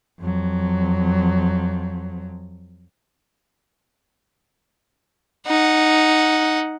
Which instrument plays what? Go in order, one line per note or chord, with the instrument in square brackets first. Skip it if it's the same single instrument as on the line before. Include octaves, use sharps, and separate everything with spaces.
[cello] F2 F#3
[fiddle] D#4 F#5